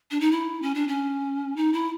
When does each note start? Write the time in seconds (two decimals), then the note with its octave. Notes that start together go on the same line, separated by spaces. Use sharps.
0.11 D4
0.20 D#4
0.32 E4
0.62 C#4
0.75 D4
0.88 C#4
1.56 D#4
1.73 E4